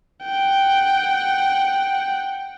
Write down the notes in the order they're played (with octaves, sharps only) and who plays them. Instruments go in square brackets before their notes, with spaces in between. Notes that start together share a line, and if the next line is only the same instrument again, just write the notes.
[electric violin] F#5 G5